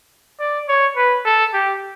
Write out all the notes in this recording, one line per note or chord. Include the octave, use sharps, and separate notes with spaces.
D5
C#5
B4
A4
G4